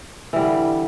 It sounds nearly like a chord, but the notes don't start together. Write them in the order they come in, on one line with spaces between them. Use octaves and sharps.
E3 G3 D3